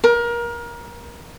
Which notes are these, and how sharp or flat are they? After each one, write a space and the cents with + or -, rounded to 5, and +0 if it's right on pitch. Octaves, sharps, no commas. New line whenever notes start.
A#4 +25